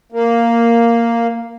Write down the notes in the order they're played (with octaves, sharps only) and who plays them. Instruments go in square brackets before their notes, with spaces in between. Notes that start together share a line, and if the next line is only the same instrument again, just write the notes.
[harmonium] A#3